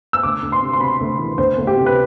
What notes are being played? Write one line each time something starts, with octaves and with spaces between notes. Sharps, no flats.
E6
D2 D6
D2
C6
C3
C6
C3 B5
D2
E3
D2 C5
D2
G4
C3
B4